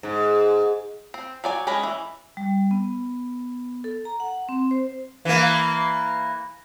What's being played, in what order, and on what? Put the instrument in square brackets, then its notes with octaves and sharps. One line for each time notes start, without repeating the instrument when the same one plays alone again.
[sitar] G#2
[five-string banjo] C4
F#3 D5 G#5
G#3 C#4 D4 B4 D#5
E3
[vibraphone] G3
B3
A4
A#5
F#5
C4
C5
[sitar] E3 A#3